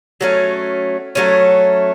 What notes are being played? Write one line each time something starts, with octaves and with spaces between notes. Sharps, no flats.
F#3 A3 C#4
F#3 A3 C#4